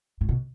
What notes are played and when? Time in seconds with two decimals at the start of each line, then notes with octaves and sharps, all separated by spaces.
0.21 A2
0.29 B2